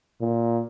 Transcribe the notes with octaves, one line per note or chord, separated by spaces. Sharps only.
A#2